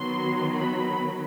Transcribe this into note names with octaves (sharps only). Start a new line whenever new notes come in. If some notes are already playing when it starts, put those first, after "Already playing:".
Already playing: D#3 F#3 B3 C6
B5